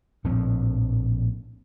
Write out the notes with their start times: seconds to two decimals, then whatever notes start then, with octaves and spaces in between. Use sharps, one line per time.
0.24 A#1 A2 F3 C4